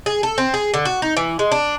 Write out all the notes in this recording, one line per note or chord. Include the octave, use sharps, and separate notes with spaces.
G#4
A4
C4
G#4
D3
F#4
D#4
E3
G#3
D4